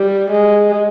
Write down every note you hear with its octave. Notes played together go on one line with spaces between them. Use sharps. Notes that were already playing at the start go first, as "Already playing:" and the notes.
Already playing: G3
G#3